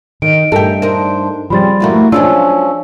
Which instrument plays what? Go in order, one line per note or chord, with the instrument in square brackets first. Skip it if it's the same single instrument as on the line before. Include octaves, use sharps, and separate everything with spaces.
[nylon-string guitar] D#3 [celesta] D#5 D7
[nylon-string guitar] G2 A3 A4 [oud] G4 A#4
[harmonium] D4 C5 [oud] D#4 A#4
[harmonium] C#3 C4 [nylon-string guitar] F3 G3 [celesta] B5 C6 A6
[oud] E2 G2 A3 [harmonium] A#3 E4 F#4
[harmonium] F3 C#4 [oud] F#3 G#3 F4 [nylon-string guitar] D4 [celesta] E6